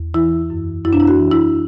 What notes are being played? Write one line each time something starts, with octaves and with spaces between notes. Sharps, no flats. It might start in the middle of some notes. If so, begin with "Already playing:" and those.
Already playing: E2
E3 E4
F#2
F#2 E4
D4
E4
F#4
E3
E4